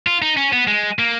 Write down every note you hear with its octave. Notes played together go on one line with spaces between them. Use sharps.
F4
D#4
C#4
B3
G#3
A#3